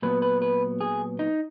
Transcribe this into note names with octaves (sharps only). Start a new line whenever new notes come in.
A#2 F#3 B3 B4
B4
B4
G#4
D#4